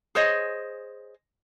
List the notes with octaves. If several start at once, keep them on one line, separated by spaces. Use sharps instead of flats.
G#4 C5 C#5 D#5